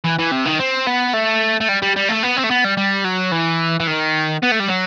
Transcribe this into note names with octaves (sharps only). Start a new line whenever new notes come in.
E3
E3
C3
D#3
C4
B3
A3
A3
G3
G3
G3
A3
B3
C4
A3
B3
G3
G3
F#3
E3
E3
D#3
B3
A3
G3
F#3